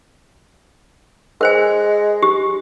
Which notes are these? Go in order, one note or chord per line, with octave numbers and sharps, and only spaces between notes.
G#3 A#4 C5 G#5
G4